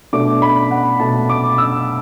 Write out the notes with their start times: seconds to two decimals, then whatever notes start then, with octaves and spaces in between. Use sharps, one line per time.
0.13 B2 A3 D4 D6
0.42 B5
0.71 F#5
1.00 B2 A3 D4 A5
1.29 D6
1.58 E6